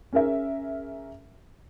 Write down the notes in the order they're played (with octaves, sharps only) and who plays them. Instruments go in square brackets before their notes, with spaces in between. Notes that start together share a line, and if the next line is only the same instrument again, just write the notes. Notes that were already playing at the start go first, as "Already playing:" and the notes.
[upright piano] C#4 G#4 A#4 E5